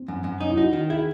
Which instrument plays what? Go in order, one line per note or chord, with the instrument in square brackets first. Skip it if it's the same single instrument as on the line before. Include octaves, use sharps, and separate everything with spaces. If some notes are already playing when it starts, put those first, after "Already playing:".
Already playing: [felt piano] C4
[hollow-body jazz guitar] F#2
F#2
[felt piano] C#4 [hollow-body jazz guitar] D#4
[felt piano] E4
[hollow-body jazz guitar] D#4 [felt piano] F#4
[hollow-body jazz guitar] D#3
[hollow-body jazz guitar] E4 [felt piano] G#4